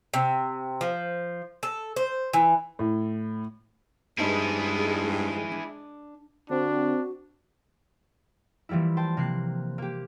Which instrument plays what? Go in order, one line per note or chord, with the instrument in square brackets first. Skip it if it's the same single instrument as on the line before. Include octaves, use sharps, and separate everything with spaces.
[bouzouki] C3
F3
A4
C5
E3
[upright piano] A2
[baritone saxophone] G2 [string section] G#3 [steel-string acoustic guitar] D#4 C5 D#5 [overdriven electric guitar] E4 G#4
[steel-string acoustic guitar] D4
[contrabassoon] D3 [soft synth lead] C4 [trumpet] D4 [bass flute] F#4
[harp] E3 F3 G3 A#3 E4
C5 G5 A5 C6
C3 A#3 F#6 C7
A#3 G4